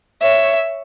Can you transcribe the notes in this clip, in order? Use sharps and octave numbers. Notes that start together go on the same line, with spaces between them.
C#5 E5